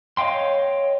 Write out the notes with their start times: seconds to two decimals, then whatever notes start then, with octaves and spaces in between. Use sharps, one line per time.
0.17 C#5 D#5 F5 G5 C6